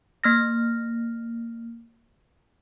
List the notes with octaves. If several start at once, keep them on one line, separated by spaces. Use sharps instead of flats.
A#3 F6 A#6